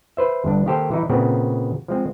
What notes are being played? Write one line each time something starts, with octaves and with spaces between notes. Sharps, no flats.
B4 C5 E5
G1 G2 D4
D#3 A#3 G4 A4 C5
E3 D#4 E4
A#2 C#3 B3 C4
F3 G#3 C4